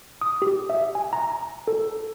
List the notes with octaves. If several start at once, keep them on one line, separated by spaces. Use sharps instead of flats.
D#6
G4
E5
G#5
A#5
A4